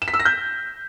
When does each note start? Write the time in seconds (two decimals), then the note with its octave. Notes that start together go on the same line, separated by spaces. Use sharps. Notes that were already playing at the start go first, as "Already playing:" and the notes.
0.02 E7
0.08 B6
0.14 E6
0.20 A#6
0.25 G6